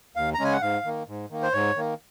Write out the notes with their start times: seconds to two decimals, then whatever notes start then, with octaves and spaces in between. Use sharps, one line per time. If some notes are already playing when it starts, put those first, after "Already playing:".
0.16 D#2 F5
0.34 A#5
0.39 C#3 G#3 C#4 G#5
0.52 F#5
0.61 G#2 F5
0.85 D#3 A#3
1.08 G#2
1.30 D#3 A#3
1.42 C5
1.53 G#2 C#5
1.76 D#3 A#3